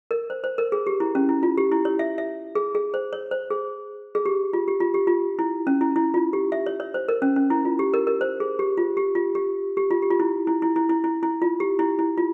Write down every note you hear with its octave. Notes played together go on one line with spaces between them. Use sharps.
A#4
C5
C5
A#4
G#4
G4
E4
C#4
E4
F4
G4
E4
C#5
E5
E5
G#4
G#4
C5
C#5
C5
G#4
G#4
G4
F4
G4
F4
G4
F4
E4
C#4
E4
E4
F4
G4
E5
C#5
C#5
C5
A#4
C#4
C#4
E4
F4
G4
A#4
A#4
C5
G#4
G4
F4
G4
F4
G4
G4
F4
G4
F4
E4
E4
E4
E4
E4
E4
E4
F4
G4
E4
E4
F4